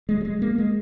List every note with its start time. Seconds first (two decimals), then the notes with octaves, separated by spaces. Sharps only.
0.09 G#3
0.21 F#3
0.25 G#3
0.42 A#3
0.58 G#3